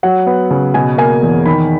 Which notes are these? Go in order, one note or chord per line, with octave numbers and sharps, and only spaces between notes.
F#3 F#5
B3
C#3
B2 G#5
A#3 G#5
E2
D#3 B5